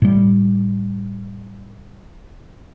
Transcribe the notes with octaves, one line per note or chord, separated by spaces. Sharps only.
A2 G3